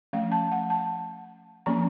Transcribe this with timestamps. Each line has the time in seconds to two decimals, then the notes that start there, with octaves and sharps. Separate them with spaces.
0.13 F3 A3 C#4 F5
0.32 A5
0.52 F#5
0.70 A5
1.66 F3 A#3 C#4 A#5